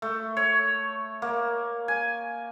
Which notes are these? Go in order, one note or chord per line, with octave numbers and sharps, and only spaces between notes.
A3
C#5
A#3
G#5